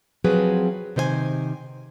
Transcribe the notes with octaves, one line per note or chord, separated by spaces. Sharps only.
F3 F#3 C4 G#4 B4
C3 D#3 C5 D5 G#5